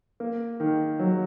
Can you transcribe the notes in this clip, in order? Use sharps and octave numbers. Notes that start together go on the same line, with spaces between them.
A#3
D#3
F#3